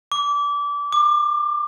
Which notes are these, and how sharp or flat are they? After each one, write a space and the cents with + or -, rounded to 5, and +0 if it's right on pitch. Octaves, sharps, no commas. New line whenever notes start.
D6 -25
D6 +25